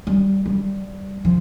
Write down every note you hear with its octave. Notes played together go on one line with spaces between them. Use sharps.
G3
G3
F3